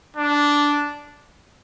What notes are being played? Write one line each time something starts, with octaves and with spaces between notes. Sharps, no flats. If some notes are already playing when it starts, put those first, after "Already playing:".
D4